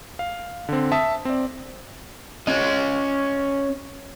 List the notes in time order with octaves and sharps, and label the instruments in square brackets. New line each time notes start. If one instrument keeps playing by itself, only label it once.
[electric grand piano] F5
D3 C4
E5 A5 D#6
C4 D5
[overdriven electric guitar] C#4 D#5